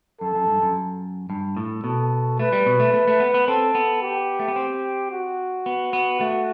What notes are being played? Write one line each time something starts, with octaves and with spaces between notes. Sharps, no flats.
F#2 A4
F#2
G2
F#2
G2
A2
B2 A4
A3 B4
G3
B2
A3
A3
A3
B3
B3
C4 A4
B3
G4
A3
B3
C4
F#4
B3
B3
A3 F#4